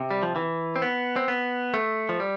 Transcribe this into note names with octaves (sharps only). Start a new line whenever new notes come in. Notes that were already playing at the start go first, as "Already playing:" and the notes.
Already playing: C3
G3
F3
E3
C4
B3
C4
B3
A3
F3
G3